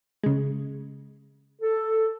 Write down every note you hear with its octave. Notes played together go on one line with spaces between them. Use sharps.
C#3 G#3
A4